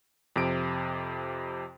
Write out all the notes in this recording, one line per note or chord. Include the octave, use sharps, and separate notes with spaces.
F2 C3 D7